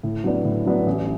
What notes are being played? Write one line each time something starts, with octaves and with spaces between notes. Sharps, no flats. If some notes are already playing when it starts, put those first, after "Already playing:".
A2
F#3 B3 D4
A2
F#3 B3 D4
A1